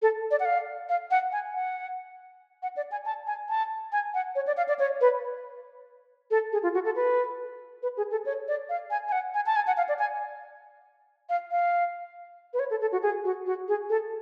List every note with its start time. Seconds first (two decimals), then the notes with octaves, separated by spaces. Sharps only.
0.02 A4
0.31 D5
0.40 F#5
0.45 F5
0.89 F5
1.11 F#5
1.32 G#5
1.54 F#5
2.63 F#5
2.77 D5
2.92 G#5
3.06 A5
3.27 G#5
3.49 A5
3.92 G#5
4.14 F#5
4.35 C#5
4.47 D5
4.57 F5
4.68 D5
4.79 C#5
5.01 B4
6.31 A4
6.52 G#4
6.63 F4
6.74 F#4
6.85 A4
6.96 B4
7.83 B4
7.97 G#4
8.11 A4
8.26 C#5
8.48 D5
8.69 F5
8.90 G#5
9.08 G#5
9.12 F#5
9.34 G#5
9.46 A5
9.56 G#5
9.67 F#5
9.77 F5
9.89 D5
9.99 G#5
11.29 F5
11.51 F5
12.54 B4
12.59 C#5
12.70 A4
12.81 A4
12.92 F#4
13.03 G#4
13.25 F#4
13.46 F#4
13.68 G#4
13.90 A4